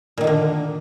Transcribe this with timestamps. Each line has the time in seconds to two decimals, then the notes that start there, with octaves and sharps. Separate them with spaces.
0.18 A#2
0.21 D#3
0.24 D3
0.27 A#3